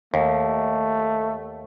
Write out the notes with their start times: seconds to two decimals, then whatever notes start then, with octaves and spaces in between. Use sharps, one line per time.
0.14 D#2 A3